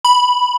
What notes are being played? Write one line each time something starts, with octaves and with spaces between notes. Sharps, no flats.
B5